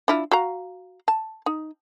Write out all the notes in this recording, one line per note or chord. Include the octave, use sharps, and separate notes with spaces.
D4 E4 F4
F#4 F5 A#5
A5
D#4